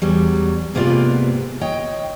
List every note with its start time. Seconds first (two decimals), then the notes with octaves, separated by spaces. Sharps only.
0.02 E2 F#3 G3
0.74 G#2 C3 A#3 B3 F4 D5
1.61 C#5 D#5 G5